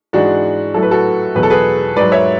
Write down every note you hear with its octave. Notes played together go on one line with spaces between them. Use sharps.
G#2 E3 G#3 D4 F#4
A2 F#3 A4
B4
F#4 A4
E2 B2 F#3 B4
A4
G#4 B4
G#2 F#3 B4 D5
C#5 E5